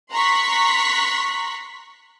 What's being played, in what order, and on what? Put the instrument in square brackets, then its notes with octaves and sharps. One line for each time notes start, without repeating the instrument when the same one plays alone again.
[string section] A#5 C6 C#6 F#6 B6